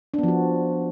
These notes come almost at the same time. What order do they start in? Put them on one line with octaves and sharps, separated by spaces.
D4 B3 F3 F#4